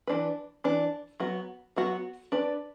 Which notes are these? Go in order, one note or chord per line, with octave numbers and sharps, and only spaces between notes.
E3 D4 B4
E3 D4 B4
F#3 B3 F#4
F#3 B3 F#4
D4 B4 D5